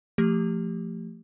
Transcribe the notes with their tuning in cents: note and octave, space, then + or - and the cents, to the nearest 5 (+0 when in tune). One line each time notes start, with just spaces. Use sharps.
F3 -10 A3 +25 G4 +0